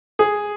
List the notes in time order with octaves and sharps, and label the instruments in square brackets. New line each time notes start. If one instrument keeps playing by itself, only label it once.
[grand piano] G#4